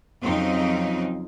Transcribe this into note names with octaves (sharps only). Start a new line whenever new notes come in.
F2 C#3 F#3 C4 D#4